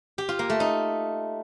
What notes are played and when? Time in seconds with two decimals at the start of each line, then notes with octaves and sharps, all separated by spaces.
0.18 G4
0.29 F4
0.39 A#3
0.50 A3
0.60 D#4